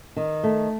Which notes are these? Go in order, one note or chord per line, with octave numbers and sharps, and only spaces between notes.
D#3
A3